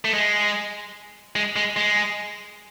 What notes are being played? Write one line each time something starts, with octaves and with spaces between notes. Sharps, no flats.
A3
G#3
G#3
G#3
G#3